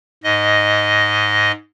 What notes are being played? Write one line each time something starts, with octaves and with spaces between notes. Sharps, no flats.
G#2 D#5